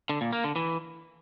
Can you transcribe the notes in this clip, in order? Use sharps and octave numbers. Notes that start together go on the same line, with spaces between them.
D3
A#2
A#3
D3
E3